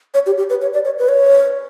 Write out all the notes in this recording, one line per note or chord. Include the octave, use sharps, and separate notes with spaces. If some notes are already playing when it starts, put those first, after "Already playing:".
C#5
G4
G4
B4
C#5
D5
C#5
B4
C#5